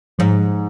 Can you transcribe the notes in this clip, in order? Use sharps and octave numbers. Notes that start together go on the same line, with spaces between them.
G#2 F3